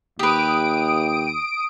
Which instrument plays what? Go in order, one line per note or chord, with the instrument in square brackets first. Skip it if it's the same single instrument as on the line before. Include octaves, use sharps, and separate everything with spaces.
[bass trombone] D#2 [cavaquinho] G4 B4 [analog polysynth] D#6 D7